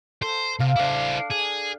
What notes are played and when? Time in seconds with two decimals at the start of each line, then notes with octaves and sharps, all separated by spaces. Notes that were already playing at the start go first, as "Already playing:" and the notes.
0.22 A4 C5
0.60 C3 F5
0.76 D4 E4 C5 D6
1.30 G#4